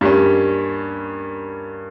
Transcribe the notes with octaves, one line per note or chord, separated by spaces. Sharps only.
G2 G3 A#3 C#4